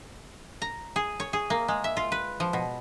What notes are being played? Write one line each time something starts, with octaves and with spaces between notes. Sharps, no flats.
A#5
G#4
C#5
G#4
A#3
G#3
E5
F4
B4
F3
B2